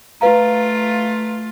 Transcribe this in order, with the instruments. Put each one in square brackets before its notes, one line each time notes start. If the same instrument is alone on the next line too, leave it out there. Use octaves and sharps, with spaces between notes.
[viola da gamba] A3 F4 [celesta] B4 F5 A#5